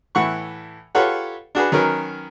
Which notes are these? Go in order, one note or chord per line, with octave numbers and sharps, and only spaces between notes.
A2 E3 F#5 C#6
F4 G4 A4 B4 C#5 F#5
D4 F#4 G#4 B4
D#3 F#3 C#4 A#4 B4